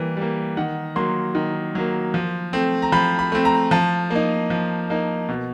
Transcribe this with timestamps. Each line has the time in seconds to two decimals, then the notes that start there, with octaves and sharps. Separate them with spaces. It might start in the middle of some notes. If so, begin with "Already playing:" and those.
Already playing: E3 G3 A#3
0.17 G3 A#3
0.57 D#3 F#5
0.96 F#3 A#3 C6
1.35 D#3
1.75 F#3 A#3
2.14 F3
2.53 A3 C4
2.82 A#5
2.92 F3 B5
3.19 B5
3.32 A3 C4
3.45 A#5
3.71 F3 A5
4.10 A#3 D#4
4.50 F3
4.90 A#3 D#4
5.29 B2